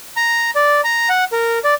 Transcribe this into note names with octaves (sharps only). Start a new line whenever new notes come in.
A#5
D5
A#5
F#5
A#4
D5